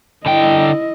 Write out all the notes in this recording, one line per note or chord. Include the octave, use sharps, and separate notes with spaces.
D3 E4 D#5 G5